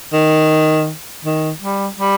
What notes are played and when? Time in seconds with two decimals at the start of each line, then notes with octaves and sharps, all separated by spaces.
0.13 D#3
1.25 D#3
1.62 G3
1.99 G3